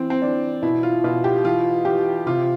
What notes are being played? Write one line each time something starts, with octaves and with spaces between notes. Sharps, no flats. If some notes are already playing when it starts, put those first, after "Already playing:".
Already playing: E3 C4
C4
E3 D4
B2 E4
F4
B2 F4
G4
E3 F4
E3 G4
C3 F4